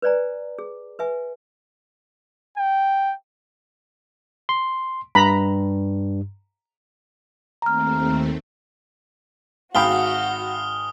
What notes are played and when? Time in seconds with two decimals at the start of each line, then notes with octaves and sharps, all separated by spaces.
0.02 B4 C5 D5 G#5 A#5
0.59 G#4
0.99 B4 E5 G#5
2.58 G5
4.49 C6
5.15 G2 A#5 B5
7.62 D#2 A3 C4 A#5 F6
9.75 G#1 F#4 F5 G5 B5 D#6 F6 G7